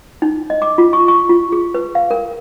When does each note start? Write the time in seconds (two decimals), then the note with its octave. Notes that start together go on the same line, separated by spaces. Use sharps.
0.22 D#4
0.50 D#5
0.62 D6
0.78 F4
0.93 C#6
1.08 C#6
1.29 F4
1.52 G#4
1.74 B4
1.95 F5
2.11 A#4